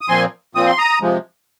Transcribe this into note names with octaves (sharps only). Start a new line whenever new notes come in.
D#6
A#2 F3 C4 G#5 C6
A#2 F3 C4 D#6
C6
A#5 D#6
C3 F3 G#3